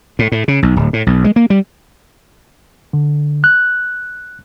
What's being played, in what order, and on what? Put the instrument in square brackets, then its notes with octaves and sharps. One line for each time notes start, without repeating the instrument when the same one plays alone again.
[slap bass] A2
A2
C#3
B1
D1
A2
B1
G#3
A#3
G3
[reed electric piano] D3
F#6